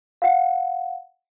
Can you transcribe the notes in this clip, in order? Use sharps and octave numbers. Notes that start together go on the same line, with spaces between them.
F5 F#5